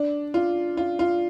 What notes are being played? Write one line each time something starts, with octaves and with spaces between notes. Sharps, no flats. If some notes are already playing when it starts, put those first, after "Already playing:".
Already playing: D4
F4
F4
F4